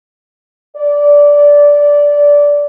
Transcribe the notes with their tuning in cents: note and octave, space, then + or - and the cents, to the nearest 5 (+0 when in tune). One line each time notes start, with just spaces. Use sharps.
D5 -15